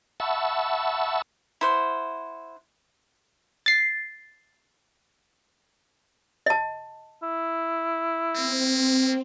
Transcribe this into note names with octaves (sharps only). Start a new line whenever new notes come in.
E5 F#5 A5 B5 C#6 E6
E4 C5 F#5
A6 C7
D#5 A5
E4
A#3 C4